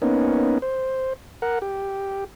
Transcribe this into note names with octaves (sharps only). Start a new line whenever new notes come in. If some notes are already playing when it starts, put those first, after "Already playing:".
A#3 B3 C#4 D#4
C5
A#4 F#5
G4